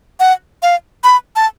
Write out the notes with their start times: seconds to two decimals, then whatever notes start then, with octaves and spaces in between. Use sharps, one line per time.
0.20 F#5
0.62 F5
1.04 B5
1.36 A5